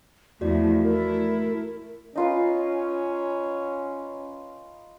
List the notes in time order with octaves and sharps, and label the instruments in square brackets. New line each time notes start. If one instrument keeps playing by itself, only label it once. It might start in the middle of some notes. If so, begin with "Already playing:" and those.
[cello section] E2 F3 A3 [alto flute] E4 [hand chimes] F#4 D5
[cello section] A3 E4 [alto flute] A#4
[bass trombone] C#4 [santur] D#4 F4 B4